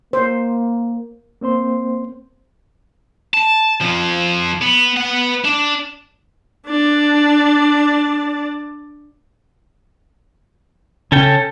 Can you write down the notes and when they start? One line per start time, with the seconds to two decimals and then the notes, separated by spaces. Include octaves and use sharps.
0.13 A#3 C5
1.41 A#3 C4 C5 C6
3.34 A5
3.81 F2 F3
4.62 B3
4.97 B4 F#5
5.44 D4
6.67 D4 D5
11.12 C#3 C#4 A4 G5